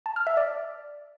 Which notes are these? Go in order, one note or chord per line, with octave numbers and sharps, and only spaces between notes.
A5
F6
E5
D5